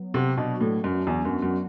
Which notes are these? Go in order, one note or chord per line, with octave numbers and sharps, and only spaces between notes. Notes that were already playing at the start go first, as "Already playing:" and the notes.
Already playing: F#3 B3
C3 F#4
B2 D4
A2 F#3
F#2 B3
E2 F#4
F#2 D4
F#2